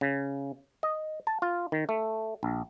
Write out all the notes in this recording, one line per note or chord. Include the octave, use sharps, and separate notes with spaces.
C#3
D#5
A5
F4
D#3
A3
A#1